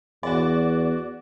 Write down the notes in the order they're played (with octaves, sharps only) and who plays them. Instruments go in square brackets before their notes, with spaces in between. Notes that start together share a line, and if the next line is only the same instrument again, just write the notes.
[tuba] E2 [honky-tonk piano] F#4 D5